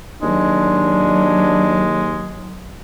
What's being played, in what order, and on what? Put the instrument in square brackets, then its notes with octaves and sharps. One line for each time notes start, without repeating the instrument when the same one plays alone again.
[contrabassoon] D#2 [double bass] F#3 [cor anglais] G#3 [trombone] D4